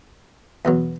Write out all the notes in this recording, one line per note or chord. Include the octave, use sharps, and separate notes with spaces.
E2 B2 F#3